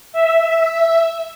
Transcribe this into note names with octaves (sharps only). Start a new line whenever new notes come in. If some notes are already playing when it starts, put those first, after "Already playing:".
E5